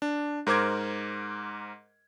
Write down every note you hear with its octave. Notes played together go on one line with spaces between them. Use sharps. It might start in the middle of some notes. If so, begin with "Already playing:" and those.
D4
G#2 A#4 C5 D6 G#6